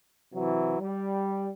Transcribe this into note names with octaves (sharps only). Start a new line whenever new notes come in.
C3 E3 F#3
G3